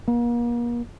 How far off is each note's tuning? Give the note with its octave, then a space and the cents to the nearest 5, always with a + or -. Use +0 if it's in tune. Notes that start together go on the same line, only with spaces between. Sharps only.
A#3 +40